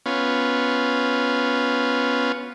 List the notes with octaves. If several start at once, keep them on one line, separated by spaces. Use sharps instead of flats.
B3 C#4 F4